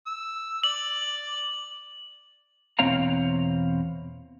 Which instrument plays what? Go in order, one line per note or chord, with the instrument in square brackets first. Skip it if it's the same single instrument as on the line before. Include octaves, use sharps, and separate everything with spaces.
[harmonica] E6
[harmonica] D5 [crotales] F#7
[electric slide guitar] E2 B2 C4 C#5 F5 A#5